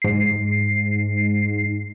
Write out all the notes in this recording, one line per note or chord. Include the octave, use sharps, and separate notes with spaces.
G#2 C7